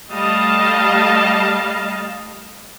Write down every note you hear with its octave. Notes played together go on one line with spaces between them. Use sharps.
G3 A3 D#5 F5 A5